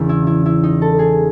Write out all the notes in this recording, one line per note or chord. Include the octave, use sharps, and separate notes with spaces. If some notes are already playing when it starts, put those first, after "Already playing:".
Already playing: E1 E2 C#3 E3
E4
E4
E4
D#4
A4
G#4